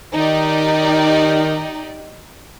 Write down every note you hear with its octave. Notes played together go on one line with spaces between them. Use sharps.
D#3 D#4 G4 D5